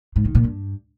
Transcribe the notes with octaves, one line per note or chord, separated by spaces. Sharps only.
G#2
D#3
A#2
G2